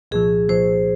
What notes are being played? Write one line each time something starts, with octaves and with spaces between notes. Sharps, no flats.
C2 A#2 F3 G#4
C2 A#2 F3 C5